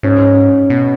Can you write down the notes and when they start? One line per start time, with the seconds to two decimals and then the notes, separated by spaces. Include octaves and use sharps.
0.03 G#2 C#4
0.70 B2